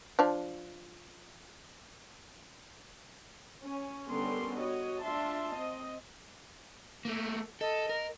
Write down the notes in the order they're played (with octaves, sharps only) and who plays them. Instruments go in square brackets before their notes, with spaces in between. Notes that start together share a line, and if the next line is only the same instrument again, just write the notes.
[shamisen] F3 D4
[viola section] C#4
D3 G3 B3 C#4 A#4 C6
F#4 C#5 D#5
D4 F4 E5 A5 C6
C4 D#5
[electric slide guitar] A3 A#3
[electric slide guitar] A4 [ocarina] D#5
[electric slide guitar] A#4